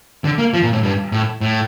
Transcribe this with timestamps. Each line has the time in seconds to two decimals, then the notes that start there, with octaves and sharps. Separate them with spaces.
0.24 D3
0.38 A#3
0.54 F3
0.63 A#2
0.73 A2
0.83 G2
1.12 A2
1.41 A2